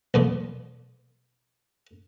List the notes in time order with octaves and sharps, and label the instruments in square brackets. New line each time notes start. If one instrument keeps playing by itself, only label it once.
[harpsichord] B1 E2 A#2